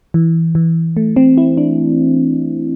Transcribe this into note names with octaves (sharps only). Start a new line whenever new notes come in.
E3
E3
A3
C4
E4
D4